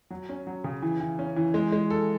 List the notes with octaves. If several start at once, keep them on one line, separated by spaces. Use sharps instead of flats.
F#3
C#4
F#3
C#3
E3
E3
C#4
E3
G#3
G#3
A4